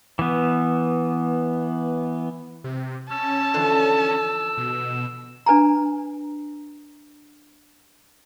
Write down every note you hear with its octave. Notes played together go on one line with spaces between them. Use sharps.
E3 B3
C3
C#4 A5 E6
D3 E3 F3
B2
D4 B4 G#5 A#5